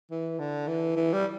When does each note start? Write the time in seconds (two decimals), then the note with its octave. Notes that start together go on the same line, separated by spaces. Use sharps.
0.11 E3
0.39 D3
0.67 E3
0.96 E3
1.13 G3